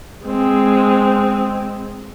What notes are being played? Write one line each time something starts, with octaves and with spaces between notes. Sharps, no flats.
G#3 C4